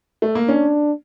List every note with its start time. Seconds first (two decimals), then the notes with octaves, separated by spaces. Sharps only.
0.22 A3
0.35 A#3
0.48 C#4 D4